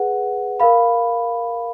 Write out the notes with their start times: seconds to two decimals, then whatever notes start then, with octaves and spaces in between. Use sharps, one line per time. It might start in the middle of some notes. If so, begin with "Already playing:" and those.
Already playing: G#4 B4 F#5
0.60 A#4 F5 B5